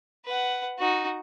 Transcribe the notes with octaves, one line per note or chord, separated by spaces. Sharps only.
B4 F#5
D#4 F#4